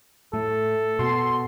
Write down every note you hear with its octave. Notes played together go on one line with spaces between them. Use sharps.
A2 A3 A4
B2 C6